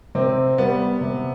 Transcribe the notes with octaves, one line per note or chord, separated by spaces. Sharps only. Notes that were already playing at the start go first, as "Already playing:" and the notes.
C3 C4
G3 B3
C3